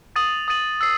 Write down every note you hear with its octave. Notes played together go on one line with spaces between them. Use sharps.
D#6 A6 D#7 F#7
D#6 A6 D#7 F#7
E6 C7